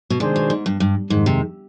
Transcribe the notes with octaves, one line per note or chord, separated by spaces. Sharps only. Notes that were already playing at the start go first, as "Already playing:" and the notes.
B2
C3 D#3 G#3 D4 G#4 C5
B2
G#2
G2
G2
F2 G#2 D#3 G#3
C3